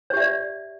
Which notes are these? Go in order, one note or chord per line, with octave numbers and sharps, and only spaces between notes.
G4 C#5 D5 E5